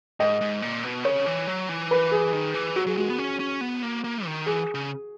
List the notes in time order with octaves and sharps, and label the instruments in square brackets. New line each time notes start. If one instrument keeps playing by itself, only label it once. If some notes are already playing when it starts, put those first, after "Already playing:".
[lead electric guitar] G#2 [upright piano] D#5
[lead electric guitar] G#2
A#2
B2
[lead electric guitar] C#3 [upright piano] C#5
[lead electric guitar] E3
F#3
E3
[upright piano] B4
G#4
[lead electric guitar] D#3
E3
[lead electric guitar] F#3 [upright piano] F#4
[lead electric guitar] F#3 [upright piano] G#4
[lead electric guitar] G#3 [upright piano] F#4
[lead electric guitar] B3
C#4
C#4
B3
A#3
A#3
D#3
[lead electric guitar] E3 [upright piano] G#4
[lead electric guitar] C#3